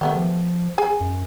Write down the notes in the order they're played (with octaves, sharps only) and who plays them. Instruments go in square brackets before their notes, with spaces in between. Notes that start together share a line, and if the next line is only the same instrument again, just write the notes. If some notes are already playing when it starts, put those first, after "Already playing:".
[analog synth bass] D#3 [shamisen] A3 B3 G4
[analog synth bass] F3
[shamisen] G#4 G#5
[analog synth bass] F#2